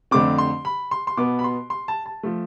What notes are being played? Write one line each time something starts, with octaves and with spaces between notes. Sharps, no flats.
F2 D3 A3 C4 D6
C6
B5
C6
C6
B2 B3 D6
B5
C6
C6
A5
A5
F3 A3